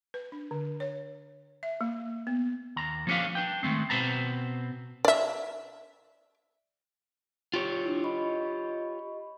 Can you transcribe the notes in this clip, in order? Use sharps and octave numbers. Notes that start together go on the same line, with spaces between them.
B4
D4
D3
C#5
E5
A#3
B3
D#2 A#5
F3 A#3 C#4 D4 G4 F5
D4 B4 G5
D#3 G#3 A3 C4
B2 C4 B4 C5 A5 A#5
D5 E5
F4 G4 C#5
D4 E4
D#5 B5 C#6